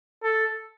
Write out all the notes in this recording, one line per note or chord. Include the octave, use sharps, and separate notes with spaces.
A4